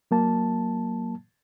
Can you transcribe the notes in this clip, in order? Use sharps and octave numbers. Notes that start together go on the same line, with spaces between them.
F#3 A#3 A5